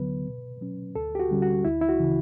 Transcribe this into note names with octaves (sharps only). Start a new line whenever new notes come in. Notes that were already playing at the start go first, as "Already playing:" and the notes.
Already playing: D2 D3 F#3 B3 B4
B2
F#3 C#4
D2 A4
G4
F#4
D3 G3 C#4
F#4
D2 E4
E4
F#4
C#3 E3